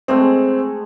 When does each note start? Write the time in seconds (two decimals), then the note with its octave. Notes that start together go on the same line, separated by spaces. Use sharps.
0.08 G#3 A3 C4 G#4